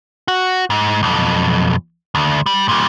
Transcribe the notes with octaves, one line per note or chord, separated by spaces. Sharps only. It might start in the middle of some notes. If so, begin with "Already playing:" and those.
F#4
G#2
B1 F2
D2
G3
A#2 G3